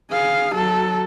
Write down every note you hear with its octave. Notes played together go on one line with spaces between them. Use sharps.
G#4 F5
F#3 A4